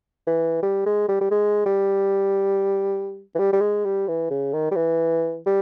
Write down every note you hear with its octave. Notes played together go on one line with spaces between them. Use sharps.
E3
G3
G#3
G3
G3
G#3
G3
E3
G3
G3
G#3
G3
E3
C#3
D#3
G3
E3
G3